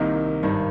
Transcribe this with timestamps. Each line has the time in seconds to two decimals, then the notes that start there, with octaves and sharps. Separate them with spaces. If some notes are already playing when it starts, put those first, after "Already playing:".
Already playing: C2 C3 D#3 A#3 D#4
0.43 G#1 G2 D#3